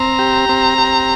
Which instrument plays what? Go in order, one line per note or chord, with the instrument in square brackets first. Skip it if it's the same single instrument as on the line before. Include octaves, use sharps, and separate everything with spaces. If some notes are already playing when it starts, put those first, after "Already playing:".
Already playing: [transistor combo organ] C4 [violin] A#5
[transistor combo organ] G4
C4
G4